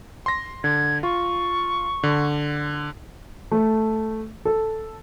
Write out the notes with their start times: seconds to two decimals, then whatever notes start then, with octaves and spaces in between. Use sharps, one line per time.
0.26 C6 A#6
0.64 D3 G#6
1.03 F4 C#6
2.03 D3
3.52 A3
4.45 A4